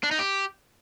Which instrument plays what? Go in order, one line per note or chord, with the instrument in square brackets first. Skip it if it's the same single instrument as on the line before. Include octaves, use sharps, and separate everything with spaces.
[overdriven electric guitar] D4
D#4
G4